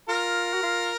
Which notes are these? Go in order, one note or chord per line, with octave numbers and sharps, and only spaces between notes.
F4 A#4
F#4
F4